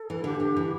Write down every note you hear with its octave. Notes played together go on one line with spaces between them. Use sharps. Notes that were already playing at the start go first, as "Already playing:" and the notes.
Already playing: A4
E3
D3 G4
D3
E3